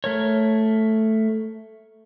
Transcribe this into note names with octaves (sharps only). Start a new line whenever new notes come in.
A3 A#4 C#5